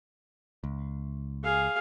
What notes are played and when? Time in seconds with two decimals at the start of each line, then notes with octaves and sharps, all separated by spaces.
0.64 C#2
1.44 G#4 F5